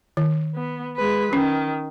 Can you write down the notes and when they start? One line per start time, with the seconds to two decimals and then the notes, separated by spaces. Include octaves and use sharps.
0.17 D#3
0.55 B3
0.97 G#3 B4
1.33 D#3 C#4